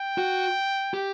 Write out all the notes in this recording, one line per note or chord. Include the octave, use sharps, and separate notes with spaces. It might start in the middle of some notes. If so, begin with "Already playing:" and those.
Already playing: G5
F#4
G4